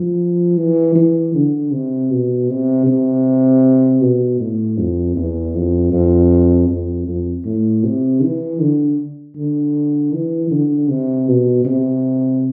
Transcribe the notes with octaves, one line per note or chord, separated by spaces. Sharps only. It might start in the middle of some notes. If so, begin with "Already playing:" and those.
Already playing: F3
E3
E3
D3
C3
B2
C3
C3
B2
A2
F2
E2
F2
F2
F2
F2
A2
C3
E3
D3
D3
E3
D3
C3
B2
C3